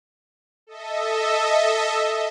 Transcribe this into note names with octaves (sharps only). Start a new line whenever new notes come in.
A4 D#5 E5